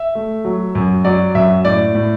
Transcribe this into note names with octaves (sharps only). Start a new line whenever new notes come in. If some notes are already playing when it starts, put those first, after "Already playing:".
Already playing: E5
A3
F#3
F#2
F#3 D5
F#2 E5
A2 D5
A2